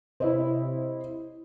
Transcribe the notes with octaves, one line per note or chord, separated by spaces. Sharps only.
C3 E4 C5 C#5 D#5